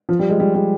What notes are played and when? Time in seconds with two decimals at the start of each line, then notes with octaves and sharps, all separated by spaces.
0.09 F3
0.19 G3
0.30 G#3
0.40 G3
0.55 G3